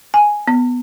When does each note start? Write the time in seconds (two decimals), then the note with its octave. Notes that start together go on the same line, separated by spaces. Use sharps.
0.14 G#5
0.48 B3